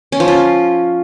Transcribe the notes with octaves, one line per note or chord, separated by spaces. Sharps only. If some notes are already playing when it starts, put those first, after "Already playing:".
C#4
F3
F4